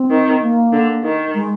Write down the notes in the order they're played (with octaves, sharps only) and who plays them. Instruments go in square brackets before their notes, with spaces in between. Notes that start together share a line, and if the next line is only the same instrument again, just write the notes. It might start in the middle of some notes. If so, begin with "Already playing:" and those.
Already playing: [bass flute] C4
[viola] D#3
[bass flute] A#3
[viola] D3
D#3
[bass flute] G#3